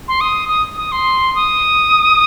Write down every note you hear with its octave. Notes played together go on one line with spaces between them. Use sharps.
C6
D#6
D#6
D#6
C6
D#6